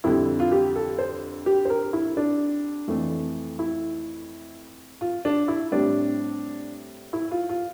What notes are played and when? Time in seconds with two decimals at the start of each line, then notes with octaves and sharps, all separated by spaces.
0.04 F2 D3 G3 E4
0.40 F4
0.52 G4
0.76 A4
0.99 C5
1.46 G4
1.65 C5
1.70 A#4
1.93 E4
2.17 D4
2.88 F2 E3 A3
3.59 E4
5.01 F4
5.25 D4
5.48 E4
5.71 A2 G3 C4 D4
7.13 E4
7.31 F4
7.49 F4